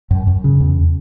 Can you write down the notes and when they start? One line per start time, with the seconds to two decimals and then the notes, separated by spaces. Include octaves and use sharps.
0.11 F#2
0.27 F#2
0.44 C#3
0.60 E2